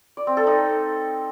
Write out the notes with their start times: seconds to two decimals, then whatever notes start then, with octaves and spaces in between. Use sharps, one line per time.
0.17 D5
0.27 C4
0.37 A4
0.47 D#4